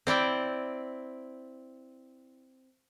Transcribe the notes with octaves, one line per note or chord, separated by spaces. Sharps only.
C4 E4 D5 G5